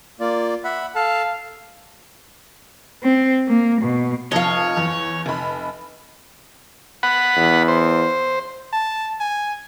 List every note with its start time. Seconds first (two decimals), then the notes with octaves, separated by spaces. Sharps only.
0.20 A#3 F4 D5
0.64 E5 F#5 B5
0.95 A4 F5 A5
3.03 C4
3.48 A#3
3.82 B2
4.32 F1 F2 C#5 D#5 F5
4.77 E2
5.26 F1 B5
7.03 F#5 B5
7.36 E2
7.68 C5
8.73 A5
9.20 G#5